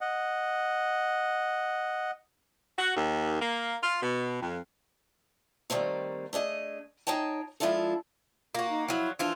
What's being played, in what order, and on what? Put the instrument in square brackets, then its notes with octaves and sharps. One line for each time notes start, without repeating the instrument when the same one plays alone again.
[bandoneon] D#5 F#5
[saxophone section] F#4
D#2
A#3
F4
B2
F2
[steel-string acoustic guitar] D#3 G3 A3 A#3 C4
A3 D4 G#4 D#5
D#4 G#4 C#5 G5 A5
F3 G#3 D4 E4 F4 A4
[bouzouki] A#3 F#4 [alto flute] F4
[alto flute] D#4
[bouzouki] F3 F#3 [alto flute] E4
[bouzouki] E3 F3 F4 [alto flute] D4